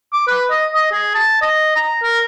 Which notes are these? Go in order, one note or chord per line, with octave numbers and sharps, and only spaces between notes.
D6
B4
D#5
D#5
G#4
A5
D#5
A#5
A#4